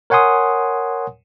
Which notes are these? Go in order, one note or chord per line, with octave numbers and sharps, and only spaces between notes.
A#4 C#5 F#5 G#5 C6 D#6